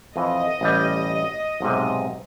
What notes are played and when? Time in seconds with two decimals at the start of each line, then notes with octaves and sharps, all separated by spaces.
0.16 F2 E3 D#5
0.61 A1 G3
1.61 B1 G#2 C3